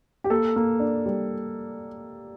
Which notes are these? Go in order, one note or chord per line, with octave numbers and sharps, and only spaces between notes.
G4
A#3 A4
A#3
D4
G3